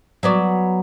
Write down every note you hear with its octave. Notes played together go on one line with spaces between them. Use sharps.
F#3 B3 D5